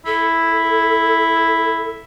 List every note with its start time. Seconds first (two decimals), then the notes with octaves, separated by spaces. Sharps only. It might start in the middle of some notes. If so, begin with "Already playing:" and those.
0.06 E4 A4